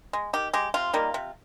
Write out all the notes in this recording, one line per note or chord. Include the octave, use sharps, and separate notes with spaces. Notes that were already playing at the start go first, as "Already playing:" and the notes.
G#3
D#3 G4
G#3 G4
C3 F4
D#3 G3 A#3
C3